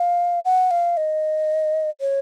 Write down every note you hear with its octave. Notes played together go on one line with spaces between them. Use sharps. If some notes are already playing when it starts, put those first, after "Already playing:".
Already playing: F5
F#5
F5
D#5
C#5